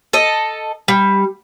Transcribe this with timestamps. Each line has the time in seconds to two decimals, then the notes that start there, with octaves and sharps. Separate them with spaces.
0.13 A4 D#5
0.88 G3